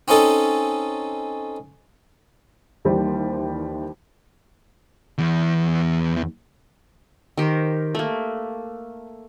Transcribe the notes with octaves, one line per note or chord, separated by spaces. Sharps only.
C4 C#4 D#4 A4
D#2 E3 G3 C5
E2 E3
D#3 G4 A#4 C5
A3 A#3